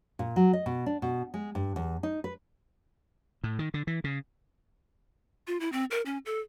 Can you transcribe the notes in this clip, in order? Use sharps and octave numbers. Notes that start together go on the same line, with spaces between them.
A#2
F#3
D#5
B2
D4
B2
G#3
G2
E2
D#4
B4
A2
D#3
D3
E3
C#3
F4
E4
C4
A#4
C#4
A4